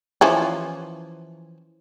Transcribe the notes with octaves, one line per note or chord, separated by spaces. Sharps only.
E3 F3 C#4